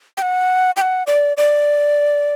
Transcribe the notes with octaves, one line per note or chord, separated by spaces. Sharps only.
G5
F#5
G5
F#5
D5
D5